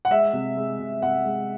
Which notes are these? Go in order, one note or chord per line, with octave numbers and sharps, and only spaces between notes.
F#5
G#3 E5
C3
G#3
C3
C3 F#5
G#3